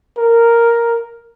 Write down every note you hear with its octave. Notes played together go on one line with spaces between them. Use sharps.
A#4